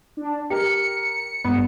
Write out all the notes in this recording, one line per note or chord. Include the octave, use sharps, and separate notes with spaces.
D4
G4 A#4 C#7
G2 B3